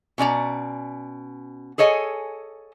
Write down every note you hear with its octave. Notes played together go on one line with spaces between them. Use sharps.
B2 C#4 D5 A#5
G#4 A4 C#5 D#5 G#5